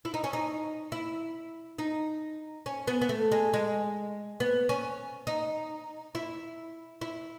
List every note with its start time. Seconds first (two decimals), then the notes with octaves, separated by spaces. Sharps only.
0.05 E4
0.14 D#4
0.24 C#4
0.33 D#4
0.92 E4
1.78 D#4
2.66 C#4
2.87 B3
3.01 B3
3.09 A3
3.32 G#3
3.53 G#3
4.40 B3
4.69 C#4
5.27 D#4
6.15 E4
7.01 E4